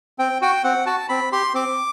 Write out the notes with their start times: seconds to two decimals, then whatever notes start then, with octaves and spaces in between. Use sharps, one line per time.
0.19 C4 G5
0.42 F#4 G5
0.64 C4 F#5
0.86 F#4 A5
1.09 C4 B5
1.32 G4 C6
1.54 C4 D6